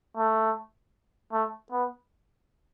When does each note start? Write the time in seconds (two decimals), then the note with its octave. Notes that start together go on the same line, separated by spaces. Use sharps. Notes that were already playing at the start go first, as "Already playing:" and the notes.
0.17 A3
1.33 A3
1.72 B3